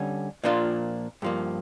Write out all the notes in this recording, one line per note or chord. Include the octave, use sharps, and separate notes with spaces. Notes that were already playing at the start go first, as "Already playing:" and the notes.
Already playing: D3 G3 C#4
A#2 F3 A#3 D4 F4
G2 F3 A#3